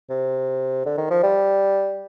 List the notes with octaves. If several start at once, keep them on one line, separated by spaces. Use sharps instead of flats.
C3
D3
D#3
F3
G3